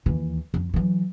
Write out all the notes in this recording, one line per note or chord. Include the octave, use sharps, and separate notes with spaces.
D#2 E3
F2
E3 F#3